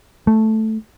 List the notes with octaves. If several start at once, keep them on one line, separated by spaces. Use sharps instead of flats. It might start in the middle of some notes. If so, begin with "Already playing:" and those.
A3